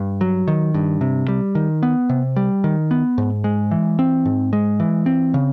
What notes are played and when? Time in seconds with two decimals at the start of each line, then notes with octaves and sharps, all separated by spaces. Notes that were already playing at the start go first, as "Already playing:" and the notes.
Already playing: G2
0.21 F#3
0.48 D#3
0.74 G2
1.01 C3
1.28 G3
1.55 D#3
1.83 B3
2.09 C3
2.36 G3
2.64 D#3
2.91 B3
3.18 G#2
3.44 G#3
3.71 E3
3.99 C4
4.25 G#2
4.53 G#3
4.80 E3
5.06 C4
5.34 C#3